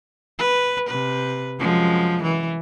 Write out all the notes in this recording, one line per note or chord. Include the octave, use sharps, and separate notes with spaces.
B4
C3 B4
F#2 F3 G#3
E3